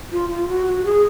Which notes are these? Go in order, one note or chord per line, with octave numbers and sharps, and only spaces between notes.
F4
F4
F#4
F#4
G#4